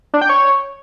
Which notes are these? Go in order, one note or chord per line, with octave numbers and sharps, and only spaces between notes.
D4
G5
C#5